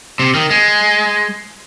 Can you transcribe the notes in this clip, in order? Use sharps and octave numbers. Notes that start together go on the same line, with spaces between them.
C3
D#3
G#3